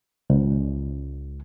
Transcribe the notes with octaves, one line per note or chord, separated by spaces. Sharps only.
C#2